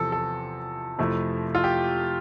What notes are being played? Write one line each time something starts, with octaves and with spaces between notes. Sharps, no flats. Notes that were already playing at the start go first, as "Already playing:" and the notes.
Already playing: E2 C3 F3 A4
A4
F2 C3 F3 A3 E4
F4
G4